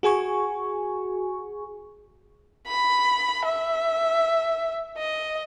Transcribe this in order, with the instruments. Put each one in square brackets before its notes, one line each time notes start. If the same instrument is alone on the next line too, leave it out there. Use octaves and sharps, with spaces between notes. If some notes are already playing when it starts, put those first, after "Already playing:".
[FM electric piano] F#4 G#4 G#5 C#6
[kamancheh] B5
E5
D#5